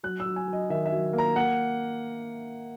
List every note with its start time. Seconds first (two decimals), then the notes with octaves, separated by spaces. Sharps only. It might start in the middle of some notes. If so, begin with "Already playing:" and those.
0.03 F#3 F#6
0.20 E6
0.26 F#3
0.36 G#5
0.48 F#3
0.53 D#5
0.69 D#3 E5
0.86 E5
0.92 F#3
1.13 A#3
1.18 A#5
1.36 A#3 F#5